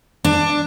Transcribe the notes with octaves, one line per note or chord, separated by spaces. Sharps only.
D4